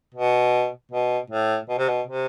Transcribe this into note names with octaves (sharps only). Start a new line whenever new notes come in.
B2
B2
A2
B2
C3
B2
C3